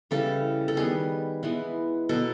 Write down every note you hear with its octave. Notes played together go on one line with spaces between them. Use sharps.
C#3 E3 G3 A4
A4
D#3 G3 B3 G#4
E3 G#3 B3
B2 F#3 B3 A4